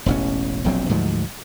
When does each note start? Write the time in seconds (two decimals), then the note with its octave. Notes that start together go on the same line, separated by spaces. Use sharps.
0.06 E1 A1 C#4
0.64 E1 A#1 F#3 C4
0.89 D2 G#2 F3 F#3